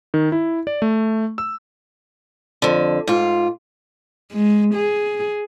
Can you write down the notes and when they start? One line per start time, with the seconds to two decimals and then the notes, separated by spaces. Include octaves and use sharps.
0.14 D#3
0.32 E4
0.67 D5
0.82 A3
1.38 E6
2.62 F2 D3
3.07 G#2 F4
4.32 G#3
4.74 G#4